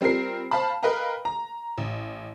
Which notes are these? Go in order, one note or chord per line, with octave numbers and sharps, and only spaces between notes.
G3 C4 F4 A#4 C7
C5 F5 A5 B5
A#4 B4 D#5 F5 G5 A#5
A#5
A1